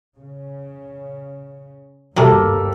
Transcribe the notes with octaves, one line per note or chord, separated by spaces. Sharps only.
C#3
G1 D#2 G#2 C3 F#3 G3 A#3 A4